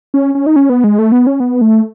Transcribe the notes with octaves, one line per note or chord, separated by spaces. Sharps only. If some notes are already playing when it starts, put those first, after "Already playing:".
C#4
C#4
D#4
C#4
B3
G#3
A3
B3
C#4
B3
A3